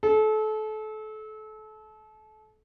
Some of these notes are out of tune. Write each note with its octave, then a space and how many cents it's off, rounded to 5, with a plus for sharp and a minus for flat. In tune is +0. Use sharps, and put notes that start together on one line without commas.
A4 -30